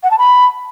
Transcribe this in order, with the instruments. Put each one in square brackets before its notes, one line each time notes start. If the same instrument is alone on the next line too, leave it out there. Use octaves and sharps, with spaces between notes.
[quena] F#5
A5
B5